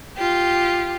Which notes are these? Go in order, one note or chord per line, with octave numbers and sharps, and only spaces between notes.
F4 G4